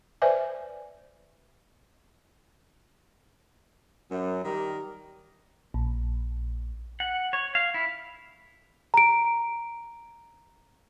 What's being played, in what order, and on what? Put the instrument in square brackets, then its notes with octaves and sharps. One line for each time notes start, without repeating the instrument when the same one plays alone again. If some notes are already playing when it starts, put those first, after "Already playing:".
[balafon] B4 C5 D5 E5 G#5
[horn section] F#2
D#3 G3 G4 A#4
[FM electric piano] A#1
[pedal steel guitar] F#5
C#5
F5
E4
[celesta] A#5 D7